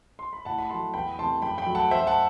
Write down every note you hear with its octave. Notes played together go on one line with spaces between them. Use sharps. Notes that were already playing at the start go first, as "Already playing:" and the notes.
C6
B5
A2 F#5 A5
B5
F#3 A3 A5 C6
E2 G5 B5
C3 E3 A3 A5 C6
F#2 G5 B5
G5 B5
F#3 A3
F#5 A5
F#2 C5 E5
F#5 A5